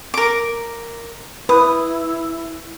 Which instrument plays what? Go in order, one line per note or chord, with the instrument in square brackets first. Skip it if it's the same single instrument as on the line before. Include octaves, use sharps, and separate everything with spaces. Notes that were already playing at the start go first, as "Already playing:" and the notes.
[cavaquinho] A#4 D6
[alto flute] E4 [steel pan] B4 [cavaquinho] D#6